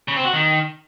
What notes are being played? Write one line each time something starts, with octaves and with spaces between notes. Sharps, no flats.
C#3
C4
F#4
D#3